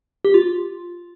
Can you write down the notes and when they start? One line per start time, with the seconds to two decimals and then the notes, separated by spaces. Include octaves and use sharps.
0.25 G4
0.34 F4